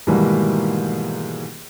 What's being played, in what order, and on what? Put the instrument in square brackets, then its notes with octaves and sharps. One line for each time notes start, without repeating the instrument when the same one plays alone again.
[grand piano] G#2 B2 D#3 E3 G3 A#3